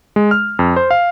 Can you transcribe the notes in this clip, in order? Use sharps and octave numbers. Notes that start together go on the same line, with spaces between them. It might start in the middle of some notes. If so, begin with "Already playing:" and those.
G#3
F6
F2
C5
F5